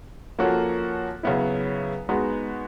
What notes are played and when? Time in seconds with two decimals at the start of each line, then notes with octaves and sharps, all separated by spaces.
0.39 F3 A#3 C#4 F#4 A4
1.23 C#3 F#3 B3 E4
2.09 G#3 B3 D#4 F#4